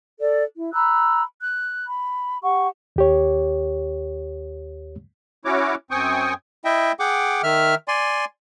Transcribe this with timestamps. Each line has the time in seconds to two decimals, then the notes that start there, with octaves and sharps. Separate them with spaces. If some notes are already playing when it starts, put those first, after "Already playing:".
0.20 A4 D5
0.55 E4
0.73 A#5 B5 E6 F#6
1.42 F#6
1.86 B5
2.42 G4 F#5 C#6
2.96 D#2 G4 C#5
5.45 C#4 E4 F#4 C#5 D6
5.91 F#2 C4 G5 G#5 C#6 D#6
6.65 E4 D#5 E5 G5
6.99 G#4 F#5 G5 D6
7.43 D#3 E5 F6
7.88 D5 G#5 C6